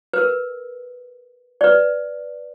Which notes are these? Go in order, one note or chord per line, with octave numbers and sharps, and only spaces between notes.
A#4 B4
B4 D5